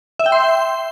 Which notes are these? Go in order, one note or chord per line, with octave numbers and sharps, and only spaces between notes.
E5
G5
C6